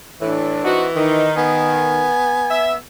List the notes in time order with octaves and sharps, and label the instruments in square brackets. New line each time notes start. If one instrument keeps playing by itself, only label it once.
[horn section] A2 E3 [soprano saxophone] D4
[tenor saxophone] E3 [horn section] C4 D#4 F#4
[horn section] D#3 [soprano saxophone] D#4
[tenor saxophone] B3 [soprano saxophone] G#5
[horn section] E5